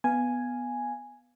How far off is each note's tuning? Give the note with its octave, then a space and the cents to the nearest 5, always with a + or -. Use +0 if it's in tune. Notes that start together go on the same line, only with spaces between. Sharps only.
B3 +0 F5 +0 G#5 +0